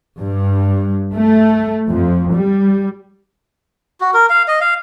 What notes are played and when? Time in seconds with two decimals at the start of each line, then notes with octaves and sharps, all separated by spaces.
0.19 G2
1.14 A3
1.89 F2
2.33 G3
4.01 F#4
4.14 A#4
4.30 F5
4.48 D#5
4.61 F5